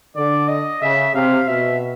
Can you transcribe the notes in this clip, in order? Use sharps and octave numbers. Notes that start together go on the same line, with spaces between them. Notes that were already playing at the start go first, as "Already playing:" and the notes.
D3 D5
D#5
C#3 E5
C3 F5
B2 E5